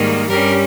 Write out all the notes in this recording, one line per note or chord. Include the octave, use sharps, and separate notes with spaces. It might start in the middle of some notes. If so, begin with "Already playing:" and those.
Already playing: G#2 D#3 G3 A#3
G2 G3 C#4 G4 A#4